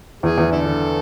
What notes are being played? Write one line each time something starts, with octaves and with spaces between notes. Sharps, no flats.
E2 G#4
E2
D3 E4 A4
D3